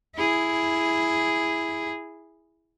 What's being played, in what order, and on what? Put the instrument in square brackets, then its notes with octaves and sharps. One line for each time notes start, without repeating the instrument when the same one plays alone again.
[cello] E4 G#4